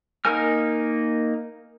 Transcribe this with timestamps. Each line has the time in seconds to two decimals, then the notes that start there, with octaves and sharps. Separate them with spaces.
0.25 A#3 D#4 A#4 G#5 F6